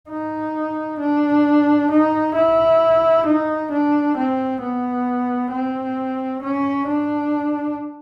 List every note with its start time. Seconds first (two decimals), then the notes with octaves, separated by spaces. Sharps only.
0.09 D#4
0.99 D4
1.90 D#4
2.35 E4
3.25 D#4
3.70 D4
4.17 C4
4.61 B3
5.51 C4
6.42 C#4
6.88 D4